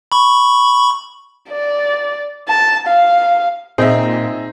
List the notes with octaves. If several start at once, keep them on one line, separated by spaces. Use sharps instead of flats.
B5 C#6
D5
A5
F5
A#2 C4 D#4 G#4 D#5 E5